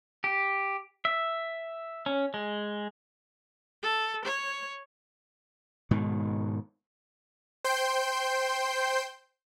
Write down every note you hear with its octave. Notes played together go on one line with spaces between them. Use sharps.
G4
E5
C#4
G#3
A4
C#5
G#2 B2 D#3
C5 G5 C6 G6